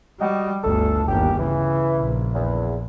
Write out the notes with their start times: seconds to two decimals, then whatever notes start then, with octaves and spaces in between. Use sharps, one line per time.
0.20 G3 F#4 D#5 G5
0.63 G1 D2 A4
1.08 G1 D#2 G4
1.39 C#3 E3
1.97 A#1
2.34 E2